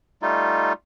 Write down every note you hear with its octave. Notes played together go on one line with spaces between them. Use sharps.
G3 A3 D#4 F4